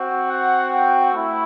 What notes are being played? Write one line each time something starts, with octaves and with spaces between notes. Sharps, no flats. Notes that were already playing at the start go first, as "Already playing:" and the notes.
Already playing: C4 F#4
F#5
G5
A3 E4